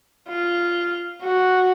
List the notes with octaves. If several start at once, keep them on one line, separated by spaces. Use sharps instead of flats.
F4
F#4